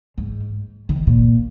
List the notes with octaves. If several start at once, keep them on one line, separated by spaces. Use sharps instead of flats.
G#2
D#3
A#2